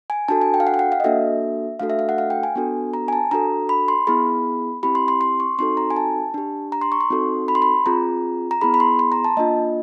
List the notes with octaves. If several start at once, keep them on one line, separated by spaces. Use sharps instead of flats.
G#5
D4 F#4 A4 A5
G#5
G5
F5
F#5
G5
F#5
F5
D#5
A#3 D4 F#4 A4 E5
A3 D4 F#4 A4 F5
E5
F5
F#5
F5
G5
G#5
B3 D4 F#4 A4
A#5
G#5
A5
D4 F#4 A4 A#5
B5
C6
B3 E4 G#4 B5
C4 E4 G4 B5
C6
C6
C6
C#6
C4 D#4 F#4 A4 C6
A#5
G#5
A5
D4 G4
A#5
C6
C#6
C6
C4 D#4 F#4 A4
B5
C6
B5
C4 F4 G#4 A#5
A#5
B3 E4 G#4 B5
B5
C6
C6
A#5
A5
A#3 D4 F4 D#5